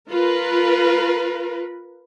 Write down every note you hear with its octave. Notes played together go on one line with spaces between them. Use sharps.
F4 A#4 B4